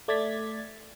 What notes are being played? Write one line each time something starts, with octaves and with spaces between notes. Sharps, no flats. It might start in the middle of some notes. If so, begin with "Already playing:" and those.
A3 D5 G#6 A6 B6